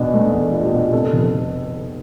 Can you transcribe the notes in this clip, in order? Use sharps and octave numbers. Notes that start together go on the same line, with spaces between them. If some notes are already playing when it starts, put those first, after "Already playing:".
Already playing: E2 B2 D4
A3
E2
D4 F4
G4
B2 F4
C3 A4
F1